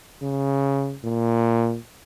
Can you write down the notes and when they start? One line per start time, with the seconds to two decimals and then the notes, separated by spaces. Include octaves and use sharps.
0.22 C#3
1.04 A#2